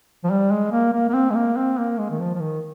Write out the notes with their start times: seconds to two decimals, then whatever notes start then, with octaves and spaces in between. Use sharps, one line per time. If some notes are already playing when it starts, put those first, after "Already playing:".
0.24 F3
0.30 G3
0.51 G#3
0.72 A#3
0.93 A#3
1.09 A#3
1.14 C4
1.30 G#3
1.35 A#3
1.56 C4
1.78 A#3
1.99 G#3
2.11 D#3
2.20 F3
2.35 F3
2.40 D#3